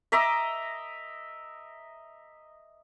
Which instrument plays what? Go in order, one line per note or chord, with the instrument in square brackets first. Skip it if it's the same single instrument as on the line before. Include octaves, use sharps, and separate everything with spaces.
[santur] D#5 E5 A#5 D6